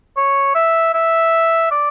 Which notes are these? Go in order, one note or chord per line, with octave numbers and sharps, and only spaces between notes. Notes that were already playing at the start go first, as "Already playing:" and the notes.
C#5
E5
E5
D5